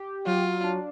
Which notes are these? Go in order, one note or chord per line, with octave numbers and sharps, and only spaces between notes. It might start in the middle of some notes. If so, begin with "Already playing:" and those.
Already playing: G4
F#3 F4
D4